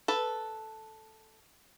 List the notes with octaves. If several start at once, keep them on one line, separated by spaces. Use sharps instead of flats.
A4 B4